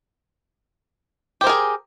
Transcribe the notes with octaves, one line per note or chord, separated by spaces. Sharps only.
G4 G#4 A#4 C5